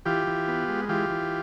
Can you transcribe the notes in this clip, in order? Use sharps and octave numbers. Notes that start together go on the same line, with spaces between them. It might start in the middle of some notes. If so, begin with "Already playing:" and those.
E3 F4 G4
E3
B3
G#3
E3 F4 G4
E3